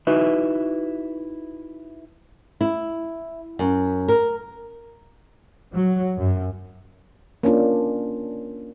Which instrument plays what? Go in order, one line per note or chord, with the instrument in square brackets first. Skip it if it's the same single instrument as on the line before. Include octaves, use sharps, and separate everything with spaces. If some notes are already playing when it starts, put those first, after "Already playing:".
[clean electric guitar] D#4 E4 F#4 B4 E5
[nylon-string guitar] E4
F#2
A#4
[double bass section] F#3
F#2
[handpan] A#3 C#4 D4 F4